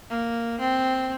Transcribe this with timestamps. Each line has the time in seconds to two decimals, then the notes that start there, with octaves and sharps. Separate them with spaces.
0.10 A#3
0.59 C4